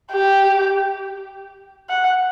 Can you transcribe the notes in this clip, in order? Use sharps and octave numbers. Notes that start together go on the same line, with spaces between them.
G4
F#5